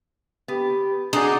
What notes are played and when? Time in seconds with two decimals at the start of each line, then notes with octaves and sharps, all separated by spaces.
0.48 B3 G4
1.13 D4 D#4 F#4 G#4 D5 C7